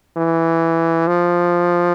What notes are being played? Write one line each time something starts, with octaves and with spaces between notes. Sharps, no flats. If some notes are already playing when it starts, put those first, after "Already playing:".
E3
F3